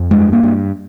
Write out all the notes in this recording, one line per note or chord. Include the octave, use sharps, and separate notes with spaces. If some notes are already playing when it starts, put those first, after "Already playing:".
Already playing: F2
G2 G#3
A#3
G2